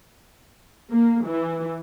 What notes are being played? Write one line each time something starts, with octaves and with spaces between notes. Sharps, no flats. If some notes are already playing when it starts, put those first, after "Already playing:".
A#3
E3